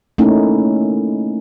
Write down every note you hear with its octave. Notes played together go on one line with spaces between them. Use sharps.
A3 A#3 C#4 D#4 E4